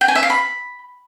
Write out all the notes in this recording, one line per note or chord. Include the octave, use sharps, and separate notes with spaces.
G5
G#5
E5
F5
B5